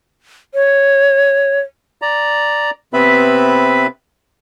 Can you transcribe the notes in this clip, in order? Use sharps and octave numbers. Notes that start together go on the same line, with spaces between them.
C#5
D5 A#5
C3 B3 C4 B4 E5 B5